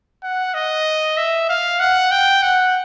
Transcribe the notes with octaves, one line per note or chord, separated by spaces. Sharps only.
F#5
D#5
E5
F5
F#5
G5
F#5